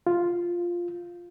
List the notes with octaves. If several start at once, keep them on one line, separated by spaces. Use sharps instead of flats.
F4